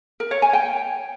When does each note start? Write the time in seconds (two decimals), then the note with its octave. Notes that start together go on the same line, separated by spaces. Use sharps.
0.20 A#4
0.31 C#5
0.42 G#5
0.53 G5